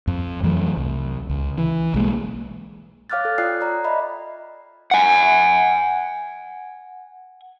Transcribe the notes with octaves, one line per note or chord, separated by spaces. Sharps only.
F2
F2 E3 F#3 A3
C2
C#2
E3
B1 G#3 A#3
C#5 F5 D6 F6 F#6 A6
A4
F4 D5 G5 D#6 F#6 C7
C#5 D5 A#5
D#5 E5 B5
F#5 G#5